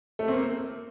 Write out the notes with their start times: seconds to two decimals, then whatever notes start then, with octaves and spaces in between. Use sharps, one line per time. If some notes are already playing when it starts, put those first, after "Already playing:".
0.19 A3
0.28 C4
0.33 A#3